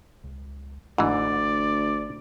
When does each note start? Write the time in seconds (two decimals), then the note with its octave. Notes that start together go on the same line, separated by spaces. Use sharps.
0.24 C#2
0.98 G1 D2 G#2 E3 D5